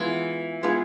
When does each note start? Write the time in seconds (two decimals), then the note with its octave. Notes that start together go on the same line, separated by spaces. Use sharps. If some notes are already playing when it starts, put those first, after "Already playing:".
Already playing: E3 G#3 B3 F4 G#4
0.63 G#3 B3 F4 G#4